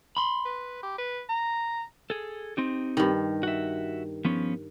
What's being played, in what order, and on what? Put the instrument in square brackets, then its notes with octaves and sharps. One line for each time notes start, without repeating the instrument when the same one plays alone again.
[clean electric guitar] B5 C6
[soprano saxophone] B4
G4
B4
A#5
[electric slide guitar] G#4 A4
C4 D#4 G4
[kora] G2 D#3
[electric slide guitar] F#4 E5
F3 B3 C#4